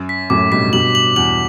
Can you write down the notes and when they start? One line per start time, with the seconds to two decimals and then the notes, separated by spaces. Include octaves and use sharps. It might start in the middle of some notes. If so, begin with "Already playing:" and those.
Already playing: F#2
0.09 B6
0.30 F#2 A2 D6
0.52 G2 B2 B6
0.73 G2 B2 F#7
0.95 F#7
1.16 E2 F#7